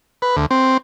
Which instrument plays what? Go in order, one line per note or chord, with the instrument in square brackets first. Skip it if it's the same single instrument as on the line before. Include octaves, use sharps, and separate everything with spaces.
[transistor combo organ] B4
D2
C4